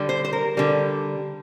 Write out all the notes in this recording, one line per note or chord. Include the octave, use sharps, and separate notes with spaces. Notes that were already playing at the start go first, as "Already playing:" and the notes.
Already playing: D3 G3
C5
C5
A#4
D3 G3